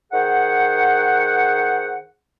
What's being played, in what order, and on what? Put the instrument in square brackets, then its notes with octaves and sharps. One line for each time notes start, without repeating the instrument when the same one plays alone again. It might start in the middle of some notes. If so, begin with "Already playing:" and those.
[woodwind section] D#3 G#4 C5 F#5